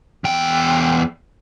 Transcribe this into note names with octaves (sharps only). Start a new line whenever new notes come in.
E2 G5